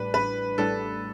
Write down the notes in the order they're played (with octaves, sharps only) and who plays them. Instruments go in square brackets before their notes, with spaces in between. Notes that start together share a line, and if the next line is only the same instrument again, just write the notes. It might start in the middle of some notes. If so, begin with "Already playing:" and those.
Already playing: [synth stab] A1 A2 G3 D4 [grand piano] B4
[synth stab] A1 [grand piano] B4
[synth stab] A2 G3 D4 [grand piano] A4